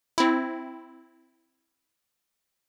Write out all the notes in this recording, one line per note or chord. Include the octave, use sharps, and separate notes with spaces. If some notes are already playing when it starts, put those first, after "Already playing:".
C4 E4